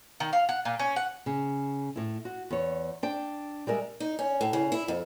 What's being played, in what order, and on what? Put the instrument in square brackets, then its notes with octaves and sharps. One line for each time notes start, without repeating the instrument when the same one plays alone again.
[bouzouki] D#3
F5
F#5
A#2
C#4
F#5
[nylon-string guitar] C#3
A2 E4
F#4
E2 C#5
D4 G5
G3 G#3 A#4 E5
[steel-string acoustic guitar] D#4
C#4
A2
C#3
E4
F2